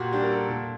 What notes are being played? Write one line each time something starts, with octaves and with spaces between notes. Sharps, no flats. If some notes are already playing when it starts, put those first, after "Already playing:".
Already playing: A#2 F#4 G4
G3 D4 G4
A#4
A4
A#2